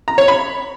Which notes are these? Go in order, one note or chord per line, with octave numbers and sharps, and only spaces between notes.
A#5
C#5
B5